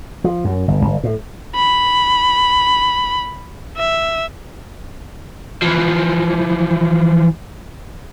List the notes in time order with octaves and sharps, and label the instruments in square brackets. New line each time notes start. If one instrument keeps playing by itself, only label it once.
[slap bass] F3
F#2
G1
G1
A2
[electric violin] B5
E5
[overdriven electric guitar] E3 F3